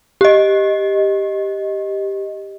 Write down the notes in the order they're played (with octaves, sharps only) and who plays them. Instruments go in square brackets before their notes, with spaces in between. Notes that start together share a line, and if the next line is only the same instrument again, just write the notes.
[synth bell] G4 D#5